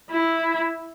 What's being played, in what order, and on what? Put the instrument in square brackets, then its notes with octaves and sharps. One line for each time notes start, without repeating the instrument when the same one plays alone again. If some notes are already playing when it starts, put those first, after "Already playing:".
[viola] E4